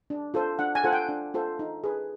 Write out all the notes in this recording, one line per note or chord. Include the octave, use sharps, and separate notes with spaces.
D4
F4 A4 C5
D4 F#5
G#5
F4 A4 C5 F#5
G5
D4
F4 A4 C5
D#4
G#4 B4